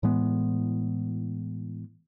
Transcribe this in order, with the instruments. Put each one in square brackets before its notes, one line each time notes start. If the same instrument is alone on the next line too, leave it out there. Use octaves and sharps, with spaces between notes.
[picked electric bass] A2 E3 G#3 B3